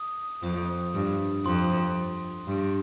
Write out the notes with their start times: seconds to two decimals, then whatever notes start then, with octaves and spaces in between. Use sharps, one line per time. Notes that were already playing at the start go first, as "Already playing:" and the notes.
Already playing: D#6
0.43 F2 D#6
0.94 G2
1.45 F2 C6
2.47 G2